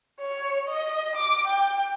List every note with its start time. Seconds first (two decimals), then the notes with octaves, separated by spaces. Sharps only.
0.20 C#5
0.68 D#5
1.16 D6
1.47 G5